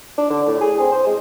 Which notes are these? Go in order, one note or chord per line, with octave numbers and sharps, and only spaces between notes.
D4
D3
A2
G#4
C4
C5
G#3